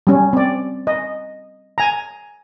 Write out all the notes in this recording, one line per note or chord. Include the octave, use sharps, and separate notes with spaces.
G3 C#4
C4 D5
D#5
G#5 A#5